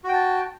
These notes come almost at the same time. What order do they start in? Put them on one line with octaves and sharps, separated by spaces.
F#4 G5 A5